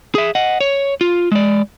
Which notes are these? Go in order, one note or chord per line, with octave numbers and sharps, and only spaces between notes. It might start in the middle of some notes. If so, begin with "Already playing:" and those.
G#4 E5
D#5 F#5
C#5
F4
G#3 D5